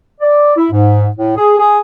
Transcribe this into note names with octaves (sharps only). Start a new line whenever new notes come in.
D5
E4
G#2
A2
G#4
G#4